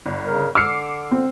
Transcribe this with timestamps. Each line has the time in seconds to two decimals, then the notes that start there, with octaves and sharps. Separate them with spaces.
0.06 G1
0.26 C#3 A#4
0.55 D3 D6 E6 F6 C7 C#7
1.11 C4